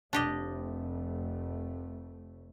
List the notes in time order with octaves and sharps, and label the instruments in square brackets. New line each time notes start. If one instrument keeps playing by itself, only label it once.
[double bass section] F1 F2 A3 [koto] D4 G4 D#5